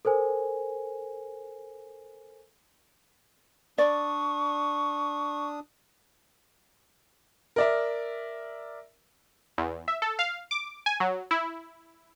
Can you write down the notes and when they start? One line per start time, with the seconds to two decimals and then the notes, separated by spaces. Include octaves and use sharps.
0.05 A4 A#4 C5 G#5
3.78 D4 D5 C#6 D#6
7.56 A#4 D5 E5
9.58 E2
9.88 E5
10.02 A4
10.19 F5
10.51 D6
10.86 G#5
11.00 F#3
11.31 E4